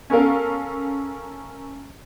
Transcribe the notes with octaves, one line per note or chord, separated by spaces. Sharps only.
C#4 A4 A#4 F5